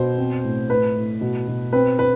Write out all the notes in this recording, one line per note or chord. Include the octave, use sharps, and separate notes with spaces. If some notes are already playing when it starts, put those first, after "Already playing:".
Already playing: B2 C5
C4
A2
A2 B4
A2
B2
B2
C4 B4
B4